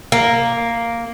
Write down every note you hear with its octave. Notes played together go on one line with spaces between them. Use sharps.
A#3